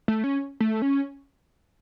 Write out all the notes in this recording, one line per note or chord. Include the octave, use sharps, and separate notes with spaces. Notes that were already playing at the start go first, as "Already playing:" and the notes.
A3
C#4
A3
C#4